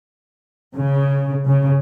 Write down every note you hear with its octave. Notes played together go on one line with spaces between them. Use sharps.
C#3
C#3